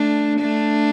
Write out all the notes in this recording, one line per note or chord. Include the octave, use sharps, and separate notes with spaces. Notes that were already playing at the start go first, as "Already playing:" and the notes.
Already playing: A3 D4
A3 D4